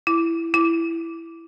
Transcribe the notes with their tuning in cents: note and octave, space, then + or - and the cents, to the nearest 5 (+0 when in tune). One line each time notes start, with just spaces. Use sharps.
E4 +10
E4 +10